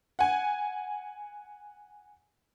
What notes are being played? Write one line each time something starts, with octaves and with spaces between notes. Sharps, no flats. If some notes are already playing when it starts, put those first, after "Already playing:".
F#5 G#5